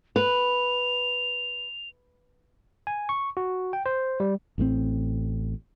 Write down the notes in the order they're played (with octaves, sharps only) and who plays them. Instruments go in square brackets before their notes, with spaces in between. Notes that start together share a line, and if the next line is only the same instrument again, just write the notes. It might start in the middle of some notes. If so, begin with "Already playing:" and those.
[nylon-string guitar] B4 [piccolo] F7
[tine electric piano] G#5
C#6
F#4
G5
C5
G3
[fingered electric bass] A1 A2 C#3 C4